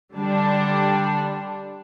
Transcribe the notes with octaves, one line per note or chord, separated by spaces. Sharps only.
D3 G3 D4